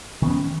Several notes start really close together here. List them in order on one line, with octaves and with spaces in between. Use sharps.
D#3 B3 C#4